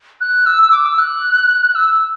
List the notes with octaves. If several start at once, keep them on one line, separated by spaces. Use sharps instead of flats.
F#6
E6
E6
D6
E6
F#6
E6